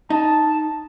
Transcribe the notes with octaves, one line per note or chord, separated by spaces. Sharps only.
D#4 A5